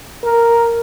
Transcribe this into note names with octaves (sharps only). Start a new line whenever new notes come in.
A#4